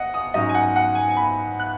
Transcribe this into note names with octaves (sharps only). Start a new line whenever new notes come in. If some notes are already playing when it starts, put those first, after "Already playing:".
Already playing: D#5 F#5
D#6
G#2 F#3 C#4 D#5
G#5
F#5
F#5
G#5
G#5
B5
F#6